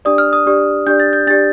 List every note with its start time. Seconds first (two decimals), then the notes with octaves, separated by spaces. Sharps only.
0.05 D4 G4 D5 D#6
0.18 F6
0.33 D#6
0.46 D4 G4 D5
0.87 D4 G4 D5 G6
1.00 A6
1.13 G6
1.27 D4 G4 D5 A6